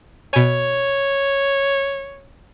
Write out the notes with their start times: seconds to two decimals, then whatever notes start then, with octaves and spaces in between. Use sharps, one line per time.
0.34 B2 C#5 G#5